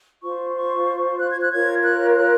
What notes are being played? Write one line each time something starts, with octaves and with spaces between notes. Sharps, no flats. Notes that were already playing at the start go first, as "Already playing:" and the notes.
F4 C5 C#6
C#6
F#6
G#6
F#6
F4 A#4 C#5 G#6
F#6
F#6